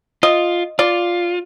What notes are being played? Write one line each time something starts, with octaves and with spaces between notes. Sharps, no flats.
F4 D#5
F4 D5